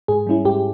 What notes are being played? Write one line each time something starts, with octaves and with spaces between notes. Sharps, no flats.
G#2 G#4
G3 C#4 E4
G#2 G4